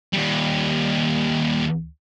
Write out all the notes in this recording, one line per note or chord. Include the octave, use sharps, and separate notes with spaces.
D#2 G3